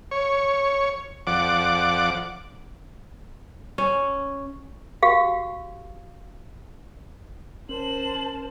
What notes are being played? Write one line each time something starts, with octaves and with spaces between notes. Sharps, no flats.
C#5
F2 D5 F#5 D6
C#4
F#4 G4 F5
C#4 A#4 C5 A5 F#7